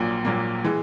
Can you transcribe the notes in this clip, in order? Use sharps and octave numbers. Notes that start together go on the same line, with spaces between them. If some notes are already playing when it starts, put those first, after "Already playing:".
Already playing: A#1 A#2 F#3 A#3
A#1 A#2 F#3 A#3
E3 G#3